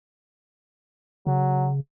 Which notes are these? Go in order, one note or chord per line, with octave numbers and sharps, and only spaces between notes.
C#3 F#3